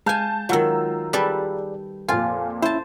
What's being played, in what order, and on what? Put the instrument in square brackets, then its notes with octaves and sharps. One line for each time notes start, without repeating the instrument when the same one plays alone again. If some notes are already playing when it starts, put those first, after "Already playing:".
[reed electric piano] G#3 [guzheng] F5 G#5 [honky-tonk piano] A5 G6
[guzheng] D#3 F#3 [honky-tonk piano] F4 A#5 E6
[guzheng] G3 A4 B4 [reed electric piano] G#4 D5
[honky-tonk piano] F2 A#2 [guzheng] F4 [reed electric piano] F5 G#5
[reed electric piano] C#4 E4 [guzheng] C5 A5